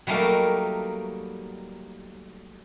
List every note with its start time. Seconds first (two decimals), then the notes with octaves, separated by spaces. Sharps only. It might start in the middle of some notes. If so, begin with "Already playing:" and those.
0.07 F#3 G3 A3 A#3 D#4 A#4